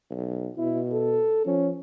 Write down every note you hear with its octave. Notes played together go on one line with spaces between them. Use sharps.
B1
B2 E4
A4
F3 C#4